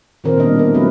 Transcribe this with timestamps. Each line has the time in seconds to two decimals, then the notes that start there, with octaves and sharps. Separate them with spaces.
0.24 A#2 D#3 C4 A#4 C5
0.38 B2 D#3 G3 B3 D4 D#5
0.55 E4 A#4
0.74 F#3 A3 C4 E4 B4